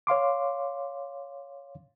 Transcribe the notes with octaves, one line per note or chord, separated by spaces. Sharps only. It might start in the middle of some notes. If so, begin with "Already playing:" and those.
C#5 F5 C6 D6